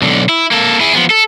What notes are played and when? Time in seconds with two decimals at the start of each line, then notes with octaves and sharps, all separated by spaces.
0.02 B1 D3
0.29 E4
0.51 A#3 A4
0.80 E4 G#4
0.95 F3 B3
1.10 A4